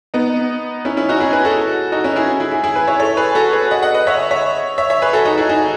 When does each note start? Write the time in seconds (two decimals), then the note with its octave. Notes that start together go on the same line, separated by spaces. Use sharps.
0.14 B3 D#4
0.85 C#4 E4
0.97 C#4 E4
1.09 D#4 F#4
1.20 E4 G#4
1.33 G#4 B4
1.45 F#4 A4
1.92 D#4 F#4
2.04 C#4 E4
2.16 E4 G#4
2.40 E4 G#4
2.51 E4 G#4
2.64 E4 G#4
2.76 G#4 B4
2.87 C#5 E5
3.00 A4 C#5
3.17 G#4 B4
3.35 F#4 A4
3.53 G#4 B4
3.71 D#5 F#5
3.82 D#5 F#5
3.94 B4 D#5
4.07 C#5 E5
4.31 C#5 E5
4.78 C#5 E5
4.90 C#5 E5
5.02 G#4 B4
5.13 F#4 A4
5.25 D#4 F#4
5.37 E4 G#4
5.49 D#4 F#4